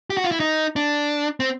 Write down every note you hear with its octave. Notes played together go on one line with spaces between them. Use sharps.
G4
F#4
F4
E4
D#4
D4
C4